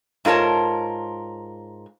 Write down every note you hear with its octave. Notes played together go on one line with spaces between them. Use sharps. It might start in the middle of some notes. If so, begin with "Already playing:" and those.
G#2 F4 A#4 C#5 A5